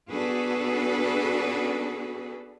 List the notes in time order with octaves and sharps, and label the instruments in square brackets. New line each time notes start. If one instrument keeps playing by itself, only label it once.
[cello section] B3 D4 F#4 G#4 A4 B4